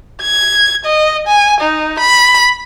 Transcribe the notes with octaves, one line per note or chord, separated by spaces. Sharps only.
G#6
D#5
G#5
D#4
B5